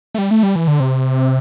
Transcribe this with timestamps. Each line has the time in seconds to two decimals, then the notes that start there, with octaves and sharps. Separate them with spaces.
0.14 A3
0.18 G3
0.31 A3
0.43 G3
0.56 E3
0.68 D3
0.80 C3